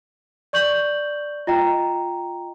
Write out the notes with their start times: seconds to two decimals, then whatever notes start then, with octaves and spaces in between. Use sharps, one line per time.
0.53 D5 C#6 G6 F#7
1.47 F4 D#5 G5 A#5